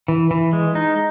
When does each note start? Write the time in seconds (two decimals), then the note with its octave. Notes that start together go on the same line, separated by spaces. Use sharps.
0.08 E3
0.31 E3
0.53 G#3
0.75 D#4